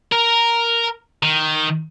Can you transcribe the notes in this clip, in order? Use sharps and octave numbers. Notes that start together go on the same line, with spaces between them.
A#4
D#3